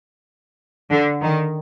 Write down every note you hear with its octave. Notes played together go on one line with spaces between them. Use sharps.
D3
D#3